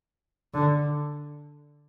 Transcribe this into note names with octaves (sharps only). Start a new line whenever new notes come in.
D3